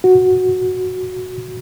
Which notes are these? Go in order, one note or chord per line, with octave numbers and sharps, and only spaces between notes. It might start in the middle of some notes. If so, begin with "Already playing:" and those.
F#4